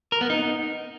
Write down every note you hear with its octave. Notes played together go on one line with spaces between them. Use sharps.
A#4
B3
D#4